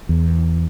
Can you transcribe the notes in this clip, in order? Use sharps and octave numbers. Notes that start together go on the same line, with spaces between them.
E2